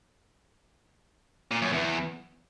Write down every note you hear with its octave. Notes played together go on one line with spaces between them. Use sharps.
A#2
F#2
E2